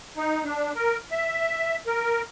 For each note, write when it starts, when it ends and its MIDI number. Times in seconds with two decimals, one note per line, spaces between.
0.17 0.44 63
0.44 0.72 62
0.75 0.97 70
1.11 1.76 76
1.87 2.22 70